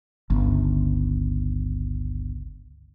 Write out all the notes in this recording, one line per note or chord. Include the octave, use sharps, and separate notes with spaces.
G1 C#2